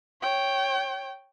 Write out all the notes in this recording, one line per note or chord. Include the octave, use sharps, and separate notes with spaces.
C#5 G5